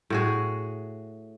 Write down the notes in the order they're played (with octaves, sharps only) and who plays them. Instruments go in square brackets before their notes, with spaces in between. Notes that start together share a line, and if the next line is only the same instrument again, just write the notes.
[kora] A2 F#4 G#4